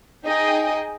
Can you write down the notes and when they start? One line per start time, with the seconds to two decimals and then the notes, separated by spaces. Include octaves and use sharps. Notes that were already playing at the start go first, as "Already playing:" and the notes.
0.25 D#4 G#4 D#5 G5